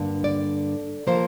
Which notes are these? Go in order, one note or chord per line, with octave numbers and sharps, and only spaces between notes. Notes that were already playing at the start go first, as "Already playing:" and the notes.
Already playing: G2 D3 A#3
D5
F3 A#3 C5